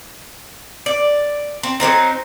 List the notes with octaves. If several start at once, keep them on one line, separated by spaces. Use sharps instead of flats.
D5
C4
F#3 G#3 C4 D#4